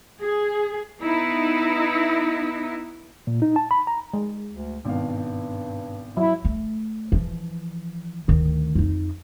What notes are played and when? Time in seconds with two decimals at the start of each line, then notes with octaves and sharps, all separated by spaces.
0.20 G#4
1.02 B3 D#4 E4
3.27 A#2
3.42 D#4
3.56 A5
3.71 B5
3.87 A#5
4.14 G#3
4.50 D2
4.85 G#1 G2 B2 F5
6.17 F#3 E4
6.45 A3
7.12 E3 F3
8.28 D2 D#3
8.75 F2 D#4